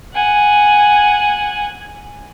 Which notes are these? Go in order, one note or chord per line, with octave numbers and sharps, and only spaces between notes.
F#5 G#5